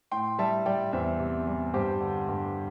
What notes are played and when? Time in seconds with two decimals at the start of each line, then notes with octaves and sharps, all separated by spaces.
0.11 A2 G5 C6
0.39 G3 E5 A5
0.66 G3 D5 G5
0.92 E2 C5 E5
1.20 C3
1.47 G3
1.74 G2 G4 C5
2.01 D3
2.28 G2